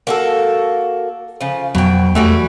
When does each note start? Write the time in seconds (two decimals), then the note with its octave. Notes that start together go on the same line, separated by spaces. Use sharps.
0.07 A#3 F#4 A4
1.41 C#3 F3
1.75 F2 B2 F#3 G5
2.15 E2 E3 G3 A3 F#4